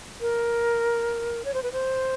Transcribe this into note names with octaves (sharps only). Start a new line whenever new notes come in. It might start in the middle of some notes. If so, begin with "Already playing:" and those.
A#4
C#5
C5
B4
C5